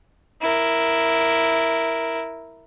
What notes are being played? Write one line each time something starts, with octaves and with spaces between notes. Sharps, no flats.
E4 A#4